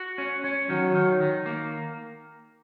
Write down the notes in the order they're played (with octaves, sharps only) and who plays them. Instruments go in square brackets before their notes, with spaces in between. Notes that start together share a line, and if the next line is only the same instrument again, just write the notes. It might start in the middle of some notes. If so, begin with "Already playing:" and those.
Already playing: [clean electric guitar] F#4
C#4
C#4
[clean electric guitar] D#3 [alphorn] F#3
[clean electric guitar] D#3
D#3
A#3